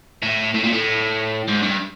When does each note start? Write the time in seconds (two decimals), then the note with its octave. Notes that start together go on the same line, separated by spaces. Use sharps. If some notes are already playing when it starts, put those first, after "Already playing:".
0.22 A2
0.54 A2
0.64 A#2
0.73 A2
1.48 G#2
1.63 G2